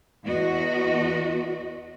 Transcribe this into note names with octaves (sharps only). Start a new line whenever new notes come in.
E2 F#4 D#5